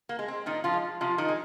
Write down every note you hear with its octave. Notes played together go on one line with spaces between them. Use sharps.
A#3
G#3
C4
A#2 D#3 D#4
F3 F4
G#3
C3 F3 F4
D#3 D#4
G#3